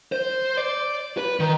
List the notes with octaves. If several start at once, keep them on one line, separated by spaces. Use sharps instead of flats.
C5
D5
B4
D#3